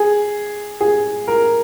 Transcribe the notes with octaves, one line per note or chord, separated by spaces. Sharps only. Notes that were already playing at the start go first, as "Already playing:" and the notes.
Already playing: G#4
G#4
A#4